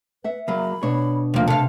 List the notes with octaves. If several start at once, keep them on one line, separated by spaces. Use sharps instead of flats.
B4 E5 F#5
F#3 A#3 B5
B2 D4 C#5
D#2 C3 F3 A3 A#3
C3 A4 F5 A5